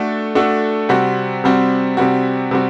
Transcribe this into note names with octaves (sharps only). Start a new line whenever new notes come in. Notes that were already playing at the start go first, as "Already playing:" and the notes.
Already playing: A3 D4 F#4 A4
A3 D4 F#4 A4
C3 G3 C4 F#4
C3 G3 C4 F#4
C3 G3 C4 F#4
C3 G3 C4 F#4